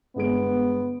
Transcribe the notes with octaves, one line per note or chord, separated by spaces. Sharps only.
G1 G#3 B3 D7